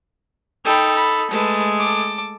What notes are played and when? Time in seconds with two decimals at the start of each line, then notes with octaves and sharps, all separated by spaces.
0.65 D#4 A4 G5 B5
0.96 B5
1.30 G#3 A3 A4 B4
1.79 A4 D6